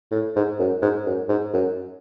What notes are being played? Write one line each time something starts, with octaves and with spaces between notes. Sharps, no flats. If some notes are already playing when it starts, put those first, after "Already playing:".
A2
G#2
F#2
G#2
F#2
G#2
F#2